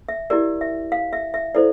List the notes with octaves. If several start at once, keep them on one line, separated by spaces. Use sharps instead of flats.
E5
E4 G4 A#4 D5
E5
F5
E5
E5
E4 A4 C5 D5